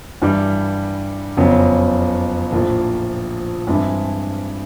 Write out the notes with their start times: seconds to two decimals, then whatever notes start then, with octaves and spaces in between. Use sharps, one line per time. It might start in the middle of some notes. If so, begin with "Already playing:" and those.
0.22 G2 E3 G3
1.37 F#1 F2 C#3 F#3 B3
2.52 A#1 A2 F3 A#3
3.67 G2 E3 G#3 C4 E4